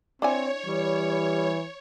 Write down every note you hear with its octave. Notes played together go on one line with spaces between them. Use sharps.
C4 D4 E4 C#5 G#5
E3 G3